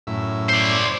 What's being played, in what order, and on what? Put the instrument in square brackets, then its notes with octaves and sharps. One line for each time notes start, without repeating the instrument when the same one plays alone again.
[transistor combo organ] F#2 A2 E5
[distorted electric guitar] C5 D5